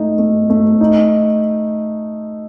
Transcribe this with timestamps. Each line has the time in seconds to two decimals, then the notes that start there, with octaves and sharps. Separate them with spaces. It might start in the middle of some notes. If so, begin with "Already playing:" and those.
Already playing: A3 D#4
0.19 A3
0.50 A3
0.81 D#4